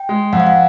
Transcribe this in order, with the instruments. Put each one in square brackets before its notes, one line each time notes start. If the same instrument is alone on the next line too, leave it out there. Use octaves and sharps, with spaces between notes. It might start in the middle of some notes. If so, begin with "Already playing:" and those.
Already playing: [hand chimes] G5
[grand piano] G#3
[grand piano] F2 [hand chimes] F#5
[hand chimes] F5
F#5